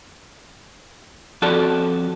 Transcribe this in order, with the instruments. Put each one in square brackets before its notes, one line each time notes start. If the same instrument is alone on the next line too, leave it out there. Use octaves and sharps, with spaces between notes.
[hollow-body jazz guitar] F2 F#4 A4 D5 A5